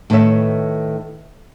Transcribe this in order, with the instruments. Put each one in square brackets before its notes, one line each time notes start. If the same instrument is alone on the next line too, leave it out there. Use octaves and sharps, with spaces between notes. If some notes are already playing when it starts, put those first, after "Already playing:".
[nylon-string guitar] A2 D#3 B4 C#5 E5